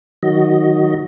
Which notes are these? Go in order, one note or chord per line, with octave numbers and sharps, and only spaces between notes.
D#3 F#3 F#4 D#5